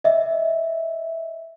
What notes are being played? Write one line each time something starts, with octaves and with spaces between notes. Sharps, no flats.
D#5 E5